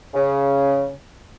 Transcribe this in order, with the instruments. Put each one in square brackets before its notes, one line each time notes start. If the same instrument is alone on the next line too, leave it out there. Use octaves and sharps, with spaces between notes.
[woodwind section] C#3